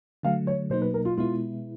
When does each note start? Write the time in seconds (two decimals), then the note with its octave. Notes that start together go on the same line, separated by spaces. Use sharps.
0.23 D3 F#3 A3 F5
0.47 C#5
0.70 B2 F#3 A#3 D#4 C5
0.82 B4
0.94 A#4
1.05 F4
1.17 B2 G#3 B3 E4 F4